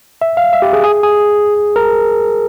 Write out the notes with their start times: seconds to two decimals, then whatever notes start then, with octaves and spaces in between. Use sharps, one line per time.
0.22 E5
0.37 F5
0.53 E5
0.62 G4
0.73 G#4
0.84 G#4
1.03 G#4
1.76 A#4